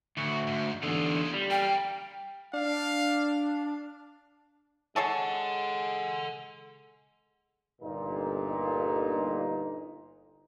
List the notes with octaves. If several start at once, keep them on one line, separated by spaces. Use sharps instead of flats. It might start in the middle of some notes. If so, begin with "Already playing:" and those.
D2 A2 F#4
G#2
E2 D3 F4 G#4
G3
A#4 F5 G5
D4 F5
G#3 G#4 A4 C#5 F#5 A5
G1 A#2 D#4